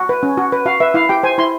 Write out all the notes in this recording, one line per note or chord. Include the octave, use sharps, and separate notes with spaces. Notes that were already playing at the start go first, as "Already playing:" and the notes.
Already playing: F#4
B4
C#4
F#4
B4
F#4 F5
B4 E5
E4 F5
G4 G5
C5 G#5
E4 C6